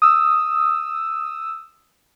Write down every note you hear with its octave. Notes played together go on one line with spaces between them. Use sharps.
D#6 E6